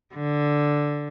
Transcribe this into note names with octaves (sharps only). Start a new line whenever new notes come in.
D3